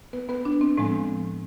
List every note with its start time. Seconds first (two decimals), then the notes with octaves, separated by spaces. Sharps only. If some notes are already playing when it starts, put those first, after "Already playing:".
0.13 B3 B4
0.29 B3 B4
0.45 D4
0.61 C4
0.78 A2 F3 G#3 B3 C4